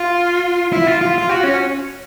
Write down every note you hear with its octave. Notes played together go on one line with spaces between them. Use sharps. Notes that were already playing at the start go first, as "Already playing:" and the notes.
Already playing: F4
E4
F4
F4
F4
F#4
C#4